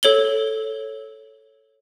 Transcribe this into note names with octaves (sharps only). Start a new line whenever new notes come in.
A4 C#5 F#7 G7